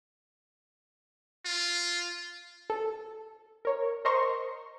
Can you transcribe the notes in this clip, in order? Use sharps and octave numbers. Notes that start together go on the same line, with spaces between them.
F4
A4
A#4 C#5
A#4 C5 D#5 A#5 C6 C#6